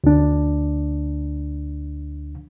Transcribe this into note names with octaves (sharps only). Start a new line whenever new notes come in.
D2 D4